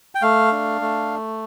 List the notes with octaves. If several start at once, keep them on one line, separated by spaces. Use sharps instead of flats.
G5
A3 F5
D4
A3